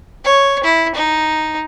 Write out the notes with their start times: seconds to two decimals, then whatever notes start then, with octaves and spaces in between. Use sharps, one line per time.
0.24 C#5
0.64 E4
0.95 D#4